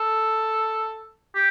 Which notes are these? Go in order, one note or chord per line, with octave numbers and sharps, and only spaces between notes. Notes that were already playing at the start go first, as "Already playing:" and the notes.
Already playing: A4
G4